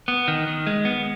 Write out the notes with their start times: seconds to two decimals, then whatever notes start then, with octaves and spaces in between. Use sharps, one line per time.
0.08 B3
0.28 D#3
0.47 D#3
0.67 G#3
0.85 B3